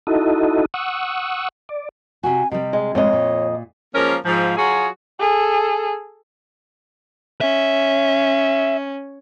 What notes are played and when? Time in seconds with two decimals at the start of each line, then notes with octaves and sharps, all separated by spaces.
0.07 D#4 E4 F#4 A4 D#5
0.74 F#5 C#6 D#6 E6
1.69 D5
2.23 C3 F#4 G#5
2.51 C3 G3 D#5
2.73 G#3
2.95 F2 A2 G#3 C#5 D#5
3.13 A#2
3.94 F3 G#3 A#3 C#4 A#4
4.25 G#2 F3
4.57 F#3 F4 F#4 G#4
5.19 G#4 A4
7.41 C#4 E5